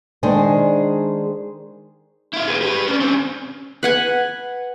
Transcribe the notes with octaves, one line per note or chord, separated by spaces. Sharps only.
D#3 G#3 D4 G#4 C5
E4 F5
G#4 B4
G4 B4
C#4 D4
C#3 C4
B4 F#5 G#5